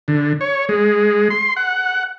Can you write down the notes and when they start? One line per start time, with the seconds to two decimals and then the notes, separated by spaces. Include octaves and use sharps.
0.08 D3
0.41 C#5
0.69 G#3
1.30 C6
1.56 F#5